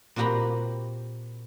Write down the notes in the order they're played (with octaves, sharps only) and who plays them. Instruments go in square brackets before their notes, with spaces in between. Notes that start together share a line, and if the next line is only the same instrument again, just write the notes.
[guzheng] A#2 C4 F#4 G4 A#5 B5